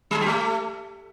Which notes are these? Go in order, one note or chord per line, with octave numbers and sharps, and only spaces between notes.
G3
G#3
G4
A3